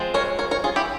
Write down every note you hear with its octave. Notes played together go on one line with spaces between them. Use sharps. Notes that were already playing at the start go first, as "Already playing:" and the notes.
Already playing: F3 G#3 C4
A#4 C#5
A#4 C#5
A#4 C#5
F4 G#4
E4 G4